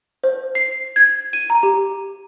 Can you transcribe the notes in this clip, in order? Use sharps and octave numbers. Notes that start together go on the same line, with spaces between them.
C5
C7
G#6
D#7
A#5
G4